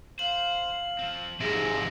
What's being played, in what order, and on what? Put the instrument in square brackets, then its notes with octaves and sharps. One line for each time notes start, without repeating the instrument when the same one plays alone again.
[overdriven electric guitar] C5 [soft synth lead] F5 [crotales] F#7
[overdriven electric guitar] F3 C4
[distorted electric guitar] G#2 C3 [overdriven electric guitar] F3 C5 [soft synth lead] G#4 [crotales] A#6